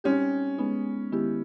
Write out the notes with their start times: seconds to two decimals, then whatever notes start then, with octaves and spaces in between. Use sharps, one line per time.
0.04 G3 C4 C#4 D#4 G4
0.58 G#3 B3 D#4
1.12 D#3 G#3 B3 E4 G4